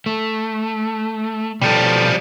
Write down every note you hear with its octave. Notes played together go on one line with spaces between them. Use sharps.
A3
B2 F3 G3 A4